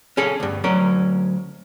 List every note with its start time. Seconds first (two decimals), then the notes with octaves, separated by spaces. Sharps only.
0.17 C#4 G#4 A4
0.40 D2 G2
0.64 D2 F#3 C#4 A#4